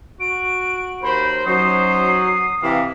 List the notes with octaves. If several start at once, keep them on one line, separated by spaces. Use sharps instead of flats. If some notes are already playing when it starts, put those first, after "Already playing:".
F#4 D7
D#2 A#4 C5 B5
F#3 C#4 D#4 C5 D#6 C7
C3 E3 F5